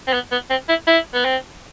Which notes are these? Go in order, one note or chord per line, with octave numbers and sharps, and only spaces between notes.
C4
B3
B3
C4
E4
E4
B3
C4